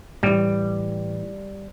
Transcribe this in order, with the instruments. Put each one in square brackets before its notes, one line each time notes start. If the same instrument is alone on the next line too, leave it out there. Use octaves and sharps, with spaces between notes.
[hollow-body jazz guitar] A2 E3 [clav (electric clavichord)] G3